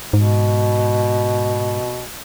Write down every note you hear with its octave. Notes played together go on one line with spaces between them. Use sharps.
G#2 B2